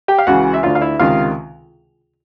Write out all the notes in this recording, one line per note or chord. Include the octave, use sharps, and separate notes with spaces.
G4 G5
F5
C#2 C#3 E3 F#4 F#5
E5
D2 D3 F4 F5
F5
E4 E5
C#2 C3 D#3 F4 F5